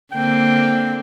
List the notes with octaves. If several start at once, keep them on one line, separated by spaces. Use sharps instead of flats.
D3 A#3 C4 G5